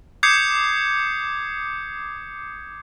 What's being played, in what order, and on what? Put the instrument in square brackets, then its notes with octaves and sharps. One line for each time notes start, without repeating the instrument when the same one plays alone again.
[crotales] D6 D#6 G6 G#6 C7 C#7